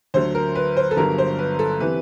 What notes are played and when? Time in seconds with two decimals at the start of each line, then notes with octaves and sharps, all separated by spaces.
0.14 D2 D3 F#3 C5
0.35 A#4
0.55 B4
0.77 C5
0.91 A4
0.97 G1 G2 D3 F#3 A#4
1.18 C5
1.39 B4
1.59 A4
1.80 C3 E3 B4